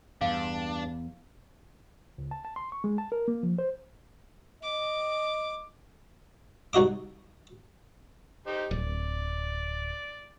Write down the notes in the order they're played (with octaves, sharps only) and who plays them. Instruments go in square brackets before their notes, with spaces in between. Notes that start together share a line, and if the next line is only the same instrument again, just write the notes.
[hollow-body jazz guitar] E2 [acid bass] G2 [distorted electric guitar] D4 [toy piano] F5
[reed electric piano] C#2
A5
A5
C6
C#6
G#3
A5
A#4
A#3
F3
C5
[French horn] D#5 [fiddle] D6
[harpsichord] C2 D#4 F#4 D#5 D6
[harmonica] D#4 G4 C5
[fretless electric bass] D1 [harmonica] D5